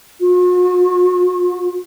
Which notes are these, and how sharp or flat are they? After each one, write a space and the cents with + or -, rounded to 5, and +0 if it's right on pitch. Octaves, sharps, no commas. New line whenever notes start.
F#4 -45